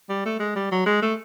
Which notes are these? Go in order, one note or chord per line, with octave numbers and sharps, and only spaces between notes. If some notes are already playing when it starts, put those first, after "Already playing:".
G3
A3
G#3
G3
F#3
G#3
A3